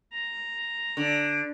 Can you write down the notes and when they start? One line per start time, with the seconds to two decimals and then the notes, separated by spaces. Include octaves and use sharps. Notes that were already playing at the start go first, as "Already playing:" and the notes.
0.13 A#5
0.97 D3